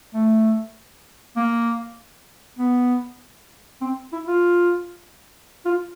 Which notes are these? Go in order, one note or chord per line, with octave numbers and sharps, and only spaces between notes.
A3
A#3
B3
C4
E4
F4
F4